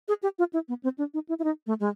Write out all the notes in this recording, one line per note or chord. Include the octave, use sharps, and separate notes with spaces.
G#4
G4
F4
E4
B3
C4
D4
D#4
E4
E4
D#4
A3
G#3